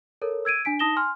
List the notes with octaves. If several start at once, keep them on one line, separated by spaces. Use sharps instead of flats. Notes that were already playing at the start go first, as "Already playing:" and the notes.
A4 A#4 C#5
E6 G#6 D7 D#7
D4 G#5 B6 D7
D#4 A5 D#6 A#6 E7 G7
G#5 C6 F6